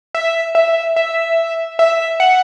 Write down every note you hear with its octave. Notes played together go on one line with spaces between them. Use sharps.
E5
E5
E5
E5
F#5